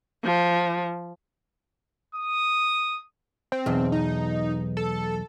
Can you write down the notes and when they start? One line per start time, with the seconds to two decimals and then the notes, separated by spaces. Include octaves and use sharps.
0.24 F3
2.15 D#6
3.52 C4
3.66 B1 E2
3.92 D#4
4.77 A4